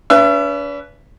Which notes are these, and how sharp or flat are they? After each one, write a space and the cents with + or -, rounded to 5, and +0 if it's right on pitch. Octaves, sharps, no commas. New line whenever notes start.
D4 -45 B4 +0 E5 +35